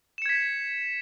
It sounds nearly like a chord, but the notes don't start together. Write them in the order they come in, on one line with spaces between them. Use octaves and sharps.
E7 C#7 G#6 B6